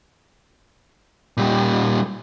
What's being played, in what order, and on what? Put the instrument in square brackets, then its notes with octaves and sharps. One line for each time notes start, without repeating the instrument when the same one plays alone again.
[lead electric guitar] A#2 G3